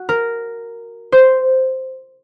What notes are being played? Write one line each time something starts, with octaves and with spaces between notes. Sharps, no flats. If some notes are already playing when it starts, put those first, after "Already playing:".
Already playing: F#4
A#4
C5